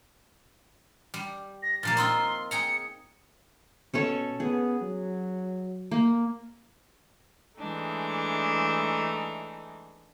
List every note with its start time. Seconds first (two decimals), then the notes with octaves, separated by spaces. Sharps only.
1.14 G3
1.62 A#6
1.83 A#2 F3 A#3 A6
1.97 C4 D#4 F4 C6
2.51 G#4 G5 A#5 C#7
3.94 B2 C#4 A4 C#5
4.40 B3 G#4
4.81 F#3
5.91 A#3
7.58 E3 G#3 A3 D4 D#4